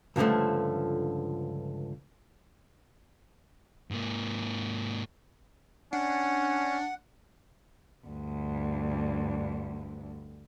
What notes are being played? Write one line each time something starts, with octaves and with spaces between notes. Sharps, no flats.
C#2 G2 D3 F3 A3
G#2 A#3
C#4 D4 F#5
D2 G2